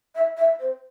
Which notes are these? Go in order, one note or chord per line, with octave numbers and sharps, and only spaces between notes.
E5
E5
C5